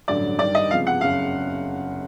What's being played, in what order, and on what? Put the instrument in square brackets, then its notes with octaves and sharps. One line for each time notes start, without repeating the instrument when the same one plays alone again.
[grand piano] A1 G2 D3 F#3 [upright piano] D5
[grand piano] G2 D#3 G3 [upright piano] D5
[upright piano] D#5
[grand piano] C#2 C3 F3 G#3 B3 [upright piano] F5
[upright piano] F#5
[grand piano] F#1 F2 C#3 [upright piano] F5